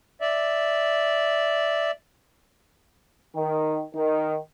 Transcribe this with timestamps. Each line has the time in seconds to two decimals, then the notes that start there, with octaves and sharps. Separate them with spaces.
0.21 D5 E5
3.35 D#3
3.95 D#3